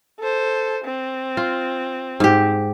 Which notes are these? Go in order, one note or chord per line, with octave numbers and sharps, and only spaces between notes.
A4 C5
C4
F4
G#2 G4